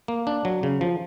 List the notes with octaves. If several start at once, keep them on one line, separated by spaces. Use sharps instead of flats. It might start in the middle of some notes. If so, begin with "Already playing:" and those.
A#3
D4
F#3
C#3
F3